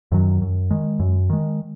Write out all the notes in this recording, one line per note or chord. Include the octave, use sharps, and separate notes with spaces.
F#2 D#3 F#3
F#2
D#3 G#3
F#2
D#3 G#3